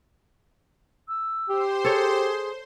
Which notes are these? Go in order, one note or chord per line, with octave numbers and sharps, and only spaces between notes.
E6
G4 C5 C6
G#4 A4 C#5